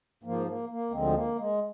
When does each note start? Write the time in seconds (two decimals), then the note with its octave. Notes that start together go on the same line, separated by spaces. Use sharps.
0.23 G#2 F3 A#3
0.47 A#3
0.69 A#3
0.91 D2 D3 F3 G#3 C4
1.14 A#3
1.36 G#3